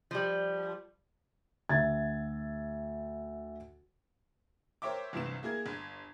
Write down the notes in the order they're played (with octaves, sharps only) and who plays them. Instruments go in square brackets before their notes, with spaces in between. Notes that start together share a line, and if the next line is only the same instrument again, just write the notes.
[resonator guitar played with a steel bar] F3 G3
[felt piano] D2 E5 G#6 A6
[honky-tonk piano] A#4 C5 C#5 E5 G5 D6
G1 C2 G2 E3 C4 E7
A#3 E4 G#4 A#4 G#6
G1